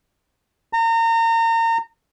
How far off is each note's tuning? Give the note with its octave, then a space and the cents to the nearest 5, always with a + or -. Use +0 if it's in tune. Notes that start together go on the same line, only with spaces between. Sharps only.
A#5 -35